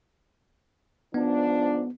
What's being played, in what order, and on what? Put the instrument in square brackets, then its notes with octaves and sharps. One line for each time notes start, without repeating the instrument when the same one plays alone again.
[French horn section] G#2 F3 D4 [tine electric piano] B3